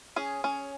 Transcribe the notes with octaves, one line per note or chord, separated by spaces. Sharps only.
C#4 G#4
C#4